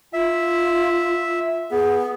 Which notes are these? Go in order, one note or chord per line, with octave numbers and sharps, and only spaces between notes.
F4 E5
B3 G#4